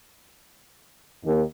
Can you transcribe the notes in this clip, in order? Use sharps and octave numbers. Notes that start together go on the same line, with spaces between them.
D#2